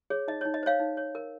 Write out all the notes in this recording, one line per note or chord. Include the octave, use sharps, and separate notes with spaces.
G#4 C#5
D#4 D#5
C#5
D#4
D#5
C5 C#5 F5
D#4
C#5
A#4